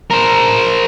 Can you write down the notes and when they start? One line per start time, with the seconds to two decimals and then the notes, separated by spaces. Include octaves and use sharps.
0.11 A#4 C5